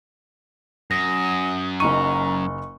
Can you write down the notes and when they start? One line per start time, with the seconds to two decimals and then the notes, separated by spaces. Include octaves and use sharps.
0.91 F#2 D#6 A#6
1.80 F#1 D#4 A#5 C#6 D#7